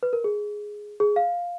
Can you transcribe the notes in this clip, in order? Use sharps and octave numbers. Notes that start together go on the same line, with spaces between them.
B4
A#4
G#4
G#4
F5